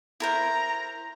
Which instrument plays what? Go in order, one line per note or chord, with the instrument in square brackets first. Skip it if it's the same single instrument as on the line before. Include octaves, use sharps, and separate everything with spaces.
[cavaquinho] E4 A#4 C5 [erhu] A#5